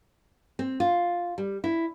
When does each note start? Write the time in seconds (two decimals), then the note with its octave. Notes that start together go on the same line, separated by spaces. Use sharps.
0.59 C4
0.80 F4
1.38 G3
1.64 E4